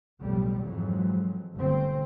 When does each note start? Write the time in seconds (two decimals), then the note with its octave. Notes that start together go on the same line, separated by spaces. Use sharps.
0.21 B1 F2 A2 G3
0.63 F2 G#2 E3 F#3
1.54 G1 A3 C4